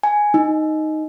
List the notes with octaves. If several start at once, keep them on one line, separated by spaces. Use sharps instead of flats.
G#5
D#4